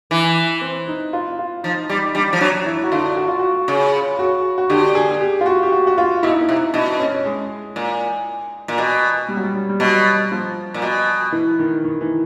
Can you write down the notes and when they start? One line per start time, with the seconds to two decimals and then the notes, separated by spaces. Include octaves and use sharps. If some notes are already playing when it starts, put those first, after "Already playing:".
0.11 E3
0.61 C4
0.88 D#4
1.13 F4
1.39 F4
1.63 F3 D#4
1.89 G3 D#4
2.15 G3 D4
2.33 F3
2.41 F#3 D4
2.66 E4
2.84 F#4
2.92 D3 F4
3.17 F#4
3.28 F4
3.39 F#4
3.68 C#3
4.19 F#4
4.58 F#4
4.70 D3 G4
4.95 G#4
5.11 G#4
5.21 G4
5.41 F4
5.46 F#4
5.63 G4
5.72 F#4
5.87 F#4
5.98 F4
6.23 B2 E4
6.32 D#4
6.41 E4
6.49 C3
6.74 B2 D4
7.00 C#4
7.25 G#3
7.76 A#2
8.68 A#2
8.78 B2
9.29 G3
9.37 F#3
9.44 G3
9.54 G3
9.69 G3
9.80 B2 F#3
10.32 F3
10.74 A#2
10.82 B2
11.32 E3
11.59 D#3
11.85 D#3
12.01 E3